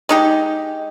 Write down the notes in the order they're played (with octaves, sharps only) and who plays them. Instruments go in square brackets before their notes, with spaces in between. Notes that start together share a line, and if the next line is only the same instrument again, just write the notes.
[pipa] G#3 D#4 G4